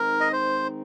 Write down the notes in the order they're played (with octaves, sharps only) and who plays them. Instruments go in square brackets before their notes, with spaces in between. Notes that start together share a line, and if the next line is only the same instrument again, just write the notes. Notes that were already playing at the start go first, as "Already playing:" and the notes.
Already playing: [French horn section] D#3 G#3 C4 D#4 [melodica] A#4
[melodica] D#5
C5